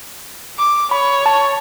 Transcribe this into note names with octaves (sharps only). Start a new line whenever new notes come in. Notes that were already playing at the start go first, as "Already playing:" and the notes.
D6
C#5 B5
A5